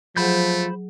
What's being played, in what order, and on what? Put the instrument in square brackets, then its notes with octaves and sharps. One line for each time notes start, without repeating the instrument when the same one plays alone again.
[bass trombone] F3 [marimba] F#3 G#4 F#5 [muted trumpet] A3 [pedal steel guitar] C5 B5 G6